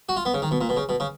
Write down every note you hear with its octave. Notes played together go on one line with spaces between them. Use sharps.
F#4
F4
B3
C#3
D#3
B2
A#2
B2
C#3
B2
C#3